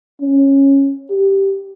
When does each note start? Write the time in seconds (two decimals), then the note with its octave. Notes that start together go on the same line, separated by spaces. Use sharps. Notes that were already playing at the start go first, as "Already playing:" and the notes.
0.21 C#4
1.10 G4